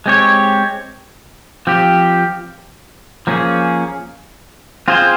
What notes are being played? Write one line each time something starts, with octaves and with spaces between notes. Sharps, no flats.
G#3 C4 G4 C#5
F3 C4 G4
F3 A#3 C#4 G#4
C4 F4 G#4 C5